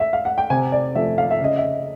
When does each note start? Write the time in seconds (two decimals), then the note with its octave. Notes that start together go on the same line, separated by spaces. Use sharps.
0.00 E5
0.13 F5
0.25 F#5
0.38 G5
0.50 C3 G#5
0.72 D5
0.95 F3 A3 E5
1.18 F5
1.31 E5
1.40 C#3 D#5
1.57 E5